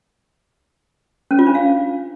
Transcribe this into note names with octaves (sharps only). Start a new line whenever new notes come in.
C#4
F4
D4
F5